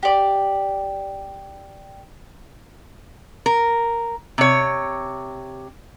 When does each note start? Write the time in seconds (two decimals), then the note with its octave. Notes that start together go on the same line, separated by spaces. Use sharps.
0.03 G4 D5
3.46 A#4
4.38 C3 C#5